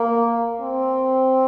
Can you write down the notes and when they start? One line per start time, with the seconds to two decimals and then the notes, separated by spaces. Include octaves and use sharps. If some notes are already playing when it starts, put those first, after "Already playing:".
Already playing: A#3
0.61 C4